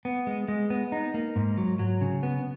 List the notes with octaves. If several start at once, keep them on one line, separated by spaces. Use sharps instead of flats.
B3
G#3
G#3
B3
D#4
A#3
G#2
F#3
F#3
C#3
B3